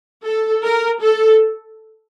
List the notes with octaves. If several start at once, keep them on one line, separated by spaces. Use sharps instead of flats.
A4
A#4
A4